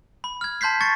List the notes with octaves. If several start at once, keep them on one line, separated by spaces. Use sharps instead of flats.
B5
F6 G#6
A5 C6 G6 B6 C7
C#6 G#6 A6 C#7